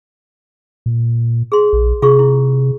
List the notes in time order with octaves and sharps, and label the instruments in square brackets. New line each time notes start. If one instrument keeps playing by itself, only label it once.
[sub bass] A#2
[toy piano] G#4 C6
[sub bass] A#1
[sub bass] C3 [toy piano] F4 G#4 C#6
[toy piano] E4